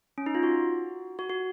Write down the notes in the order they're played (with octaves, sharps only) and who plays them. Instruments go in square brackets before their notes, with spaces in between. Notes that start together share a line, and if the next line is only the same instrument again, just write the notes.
[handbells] C#4
D#4
F4
F#4
F#4
F#4